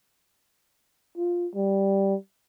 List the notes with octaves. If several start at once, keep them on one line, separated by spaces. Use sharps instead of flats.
F4
G3